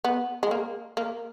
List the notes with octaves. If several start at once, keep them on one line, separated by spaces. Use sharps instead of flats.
B3
G#3
A#3
A#3